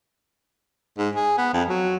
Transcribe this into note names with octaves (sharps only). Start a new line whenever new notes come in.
G#2
G#4
B3
F2
F#3